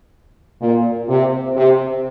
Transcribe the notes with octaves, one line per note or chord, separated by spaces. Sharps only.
A#2
C3
C3